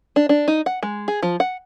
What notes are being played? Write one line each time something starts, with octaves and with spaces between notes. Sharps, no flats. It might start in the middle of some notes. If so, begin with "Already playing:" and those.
D4
D4
D#4
F#5
G#3
G#4
F3
F#5